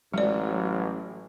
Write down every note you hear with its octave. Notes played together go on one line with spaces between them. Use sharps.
A1 F#3 G#3 D5